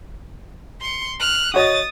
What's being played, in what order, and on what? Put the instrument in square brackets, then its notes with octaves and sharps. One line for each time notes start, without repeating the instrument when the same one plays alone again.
[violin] C6 C#7
F6 F#6
[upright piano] F#4 C#5 D#5 [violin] D#6 A6